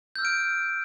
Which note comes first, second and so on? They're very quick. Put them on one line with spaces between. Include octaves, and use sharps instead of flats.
G6 E6 F6 D7